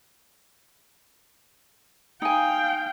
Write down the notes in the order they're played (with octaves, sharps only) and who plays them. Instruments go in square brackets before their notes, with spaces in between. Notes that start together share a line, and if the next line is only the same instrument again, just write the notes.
[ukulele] D#4 G#5 [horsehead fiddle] F5 G5